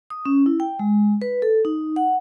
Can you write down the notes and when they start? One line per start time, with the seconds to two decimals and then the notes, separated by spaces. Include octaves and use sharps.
0.10 D#6
0.26 C#4
0.46 E4
0.60 G5
0.79 G#3
1.22 B4
1.42 A4
1.65 D#4
1.96 F#5